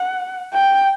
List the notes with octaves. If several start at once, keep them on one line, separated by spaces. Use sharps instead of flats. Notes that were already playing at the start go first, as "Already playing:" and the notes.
Already playing: F#5
G5